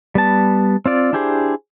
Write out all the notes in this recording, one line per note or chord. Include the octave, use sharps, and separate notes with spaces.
G3 B3 A5
C4 F4 D5
D4 E4 G4 G#4 C5